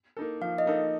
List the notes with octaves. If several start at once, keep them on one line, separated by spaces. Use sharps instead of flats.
A#3 D#4 A4
F3 F5
D#5
A#3 D#4 A4